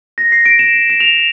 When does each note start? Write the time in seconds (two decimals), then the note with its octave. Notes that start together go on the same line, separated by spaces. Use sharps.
0.18 A#6
0.32 C7
0.46 D7
0.59 E7
0.90 E7
1.00 F7